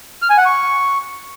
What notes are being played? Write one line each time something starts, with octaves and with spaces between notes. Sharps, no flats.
F6
G#5
F#5
C#6